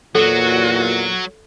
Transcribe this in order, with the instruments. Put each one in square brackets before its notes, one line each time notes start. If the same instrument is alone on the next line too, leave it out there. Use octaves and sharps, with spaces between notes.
[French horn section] E2 A#2 [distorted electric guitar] F#3 [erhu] F#4 [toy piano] A4